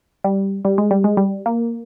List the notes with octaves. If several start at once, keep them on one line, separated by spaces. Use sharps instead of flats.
G3
G3
G#3
G3
G#3
G3
A#3